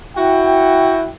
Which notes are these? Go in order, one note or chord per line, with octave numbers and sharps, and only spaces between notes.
E4 F#4 G5